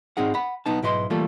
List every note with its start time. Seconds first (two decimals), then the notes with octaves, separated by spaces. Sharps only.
0.17 G#2 C4 D#4 G#4 F#5
0.34 F#5 B5
0.66 B1 B3 D#4 A5
0.82 B1 G#2 E4 B4 D#5 C6
1.10 E3 G3 A3 A#3 F4 A4